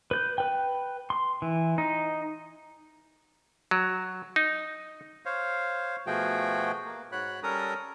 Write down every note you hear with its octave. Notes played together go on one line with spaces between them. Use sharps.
B4 G6
B4 G5
C6
E3
D#4
F#3
D#4
C5 C#5 F5
B2 F3 A3 F#4 G#4 G5
A#3
G#2 F#4 C#5 B5 F#6
G3 C#4 A4 A#4 A#5 D#6